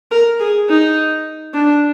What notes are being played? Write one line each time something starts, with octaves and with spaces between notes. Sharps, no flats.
A#4
G#4
D#4
D4